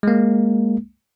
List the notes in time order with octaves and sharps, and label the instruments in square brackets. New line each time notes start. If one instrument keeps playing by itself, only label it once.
[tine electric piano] G#3 A#3